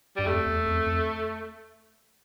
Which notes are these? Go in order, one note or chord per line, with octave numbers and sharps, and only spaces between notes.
G2 G3
F2 A3
E2
F2
F2